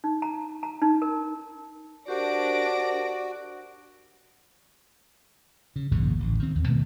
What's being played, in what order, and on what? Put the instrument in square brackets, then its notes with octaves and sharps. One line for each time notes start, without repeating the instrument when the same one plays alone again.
[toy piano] D#4
A#5
A#5
D#4
A#4
[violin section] D4 A#6 D7 [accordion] F#4 [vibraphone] G4 A#4 C5 [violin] D5
[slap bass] C#3
A#1 D#2 G#2 C#3
A1 D2
D#3 C4
D#2
B2 D#3 A3 B3